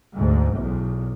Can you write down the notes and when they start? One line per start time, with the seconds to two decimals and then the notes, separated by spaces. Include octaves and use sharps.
0.15 D2 G#2
0.55 B1 E2